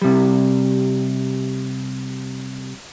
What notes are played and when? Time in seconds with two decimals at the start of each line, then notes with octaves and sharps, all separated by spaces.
0.02 C3 G3